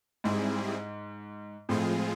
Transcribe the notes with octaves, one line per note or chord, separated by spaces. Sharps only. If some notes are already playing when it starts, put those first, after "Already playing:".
G#2 G3 C4 E4 G#4
A2 F3 G#3 C4 F4 G#4